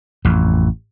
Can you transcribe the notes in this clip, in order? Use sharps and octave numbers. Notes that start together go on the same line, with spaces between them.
A1 F2